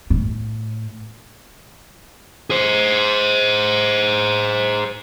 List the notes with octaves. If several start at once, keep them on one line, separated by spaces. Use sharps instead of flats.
A2
G#4 C5